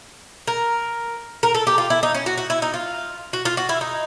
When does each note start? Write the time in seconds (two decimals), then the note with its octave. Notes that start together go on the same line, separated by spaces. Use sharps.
0.47 A#4
1.43 A#4
1.55 A4
1.67 G4
1.78 F4
1.90 E4
2.03 D#4
2.14 C#4
2.26 F#4
2.38 F#4
2.50 E4
2.62 D#4
2.74 F4
3.33 F#4
3.45 F4
3.57 F#4
3.69 E4
3.81 D#4